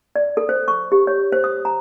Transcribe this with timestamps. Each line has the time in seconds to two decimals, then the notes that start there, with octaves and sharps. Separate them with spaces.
0.16 D5
0.37 A4
0.49 C5
0.68 C#6
0.92 G4
1.07 C#5
1.32 C5
1.44 D#6
1.65 A#5